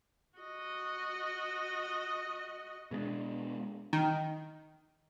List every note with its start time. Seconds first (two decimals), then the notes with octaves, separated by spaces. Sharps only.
0.39 F#4 D#5
2.91 B2 G#3 B3 D4
3.93 D#3